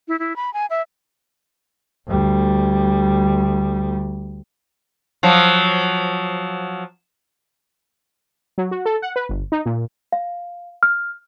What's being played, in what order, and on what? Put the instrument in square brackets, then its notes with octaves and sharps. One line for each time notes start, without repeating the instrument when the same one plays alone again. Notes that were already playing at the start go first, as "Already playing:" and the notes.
[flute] E4
E4
B5
G#5
E5
[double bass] D2 G3
[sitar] F3 F#3
[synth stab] F#3
F#4
A4
F#5
B4
G1
D#4
A#2
[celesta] F5
F6